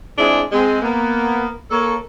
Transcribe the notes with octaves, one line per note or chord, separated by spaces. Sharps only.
G#3 C4 D4 E4 F4 G#4
G#3 C4
A#3 B3
A#3 A4 C#5